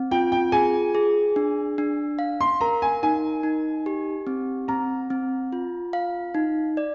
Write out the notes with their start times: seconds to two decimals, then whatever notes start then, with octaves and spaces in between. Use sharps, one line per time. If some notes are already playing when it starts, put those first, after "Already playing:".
Already playing: C4
0.11 F4 G5
0.32 G5
0.52 G#4 G#5
0.95 G#4
1.36 D4
1.78 D4
2.19 F5
2.41 C6
2.61 A#4 A#5
2.82 G#5
3.03 D#4 G#5
3.43 D#4
3.86 G4
4.27 C4
4.68 C4 A#5
5.10 C4
5.52 F4
5.93 F5
6.34 D#4
6.77 D5